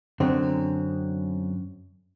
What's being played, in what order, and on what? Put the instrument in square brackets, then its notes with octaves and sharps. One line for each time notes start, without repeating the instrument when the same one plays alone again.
[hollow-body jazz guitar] F#2 D3 C4